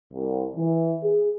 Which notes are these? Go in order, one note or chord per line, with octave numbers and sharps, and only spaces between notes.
C2
E3
G#4